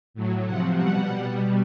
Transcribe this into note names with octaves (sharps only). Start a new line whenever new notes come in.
A2 F#3
C3 F3 F#5
B2 G3 F#5
B2 G3